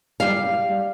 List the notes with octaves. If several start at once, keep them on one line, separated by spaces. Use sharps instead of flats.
G3 F5